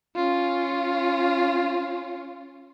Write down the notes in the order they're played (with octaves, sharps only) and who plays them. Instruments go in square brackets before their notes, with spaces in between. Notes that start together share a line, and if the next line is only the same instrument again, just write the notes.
[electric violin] C#4 F4